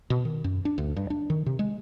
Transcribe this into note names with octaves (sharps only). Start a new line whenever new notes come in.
B2
D#3
F#2
D4
D2
G2
D4
D#3
C3
G#3